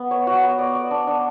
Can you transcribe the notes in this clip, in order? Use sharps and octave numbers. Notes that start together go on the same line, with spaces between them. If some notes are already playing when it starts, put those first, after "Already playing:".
Already playing: B3
C#5
F#4
B3
D5
D5
D4
D4